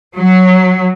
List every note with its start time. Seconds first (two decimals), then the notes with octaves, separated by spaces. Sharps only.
0.16 F#3